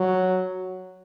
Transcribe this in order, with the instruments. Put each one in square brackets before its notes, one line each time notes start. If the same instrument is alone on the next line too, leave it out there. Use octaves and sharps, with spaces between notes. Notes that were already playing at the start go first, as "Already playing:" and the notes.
Already playing: [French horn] F#3